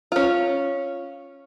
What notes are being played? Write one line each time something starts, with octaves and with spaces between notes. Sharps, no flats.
C#4 F4